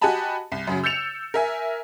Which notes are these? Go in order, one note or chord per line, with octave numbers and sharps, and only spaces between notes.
F#4 G4 D#5 G#5 A5 B5
C2
F#2 C#3 F#3
E6 G6 A6 C#7 E7 F7
A#4 E5 G#5